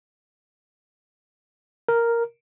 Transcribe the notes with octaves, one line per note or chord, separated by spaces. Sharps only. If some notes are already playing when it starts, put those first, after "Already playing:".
A#4